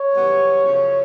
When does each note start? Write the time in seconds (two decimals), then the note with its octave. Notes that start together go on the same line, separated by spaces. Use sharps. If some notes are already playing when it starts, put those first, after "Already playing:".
Already playing: C#5
0.14 F#2 C#3 E3 G3 B3
0.65 F#2 C#3 F3